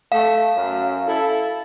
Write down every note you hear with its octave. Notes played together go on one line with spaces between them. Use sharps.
A3 F5
F#2
E4 A4